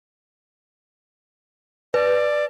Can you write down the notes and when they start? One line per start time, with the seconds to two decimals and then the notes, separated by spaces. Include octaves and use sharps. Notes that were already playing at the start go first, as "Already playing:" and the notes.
1.94 B4 D5